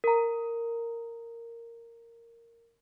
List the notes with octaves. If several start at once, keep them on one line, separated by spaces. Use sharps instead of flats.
A#4 A#5